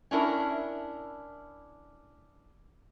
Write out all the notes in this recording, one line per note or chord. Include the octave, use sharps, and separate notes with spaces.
C#4 D4 E4 A#4